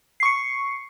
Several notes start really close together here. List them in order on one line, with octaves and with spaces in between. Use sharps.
C7 C#6 C#7